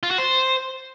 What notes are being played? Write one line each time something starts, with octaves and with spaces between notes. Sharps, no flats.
F4
F#4
C5